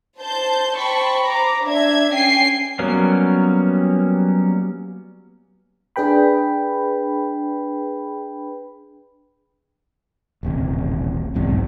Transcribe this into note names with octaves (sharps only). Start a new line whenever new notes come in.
C5 A5 G6
C5 G5 A5 B5 C#6
C5 A#5 D6
D4 E5 G#6
C#4 G5 G#5 C7
F#3 G3 A#3 B3 C#4
D4 G#4 B4 G5 B5
D#1 A1 C3
B1 E2 G#2 C3